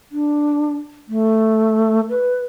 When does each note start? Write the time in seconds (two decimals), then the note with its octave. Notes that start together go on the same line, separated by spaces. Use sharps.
0.12 D4
1.08 A3
2.09 B4